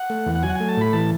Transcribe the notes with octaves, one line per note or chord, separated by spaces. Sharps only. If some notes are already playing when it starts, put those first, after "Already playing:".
Already playing: F#5
A3
E2
F#5
F#3 G#5
F#5
A3 G#5
A5
A2 B5
E3 A5